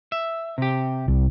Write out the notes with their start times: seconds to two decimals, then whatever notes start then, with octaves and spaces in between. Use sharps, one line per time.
0.12 E5
0.58 C3 G4
1.08 C2